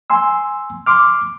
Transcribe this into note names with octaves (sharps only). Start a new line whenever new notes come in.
G#5 C6 E6
C6 D6 F6